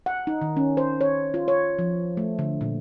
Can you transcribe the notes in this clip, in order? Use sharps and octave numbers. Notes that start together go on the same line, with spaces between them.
F#5
D#4
D#3
C#4
C5
C#5
F4
C#5
F3
A3
D3
A#2